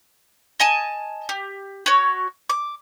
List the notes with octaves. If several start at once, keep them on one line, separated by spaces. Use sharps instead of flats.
D#5 G#5 A5
G4
F#4 C#5
D6